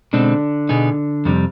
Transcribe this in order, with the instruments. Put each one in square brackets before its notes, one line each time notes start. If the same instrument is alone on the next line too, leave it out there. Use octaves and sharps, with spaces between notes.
[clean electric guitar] B2 G#3 C4 D#4 [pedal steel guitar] D3 D4
[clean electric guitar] B2 B3 D#4 G#4
F2 C3 G3